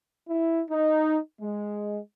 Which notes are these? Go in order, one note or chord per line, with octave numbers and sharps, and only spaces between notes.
E4
D#4
G#3